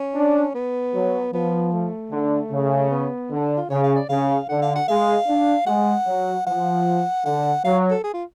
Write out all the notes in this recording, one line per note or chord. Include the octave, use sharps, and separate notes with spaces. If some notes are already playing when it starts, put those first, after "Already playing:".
Already playing: C#4
D4
B3
F#3
F3 B3
A3
D3
C#3
B3
D3
D4
F4
C#3 C#5
F5
D5
C#3 F5
D3 F#5
F5
F#5
G#3 F5
D4
G#3 F#5
F#3
F3 F#5
D3 F#5
F#3 F5
A4
G#4
F4